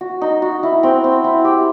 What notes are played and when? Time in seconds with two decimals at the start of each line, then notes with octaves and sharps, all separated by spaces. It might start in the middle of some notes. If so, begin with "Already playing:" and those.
0.01 F#4
0.21 D#4
0.42 F#4
0.63 E4
0.83 C4
1.04 C4
1.24 E4
1.44 G4